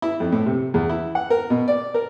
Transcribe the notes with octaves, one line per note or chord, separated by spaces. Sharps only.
E4
F2
A2
C3
E2
E4
F#5
A#4
B2
D5
A#4